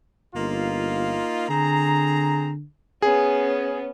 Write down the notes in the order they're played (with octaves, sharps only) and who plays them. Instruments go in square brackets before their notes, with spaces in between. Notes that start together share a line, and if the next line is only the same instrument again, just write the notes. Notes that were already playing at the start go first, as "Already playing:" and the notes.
[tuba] G1 [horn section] A#3 D#4 F4
[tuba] D3 [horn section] C4 G#4 A#5
[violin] B3 C#4 [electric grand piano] G#4